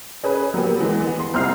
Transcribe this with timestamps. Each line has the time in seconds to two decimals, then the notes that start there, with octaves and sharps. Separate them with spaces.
0.24 C#4 G#4 B4
0.54 F#3 A#3 B3 G4
0.80 E3 G#3
1.01 B3
1.19 C6
1.34 C2 C4 E4 F6 C7